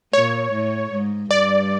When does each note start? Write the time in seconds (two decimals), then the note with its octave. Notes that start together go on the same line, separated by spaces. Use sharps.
0.13 A#2 C#5
0.53 A2
0.92 G#2
1.31 G2 D5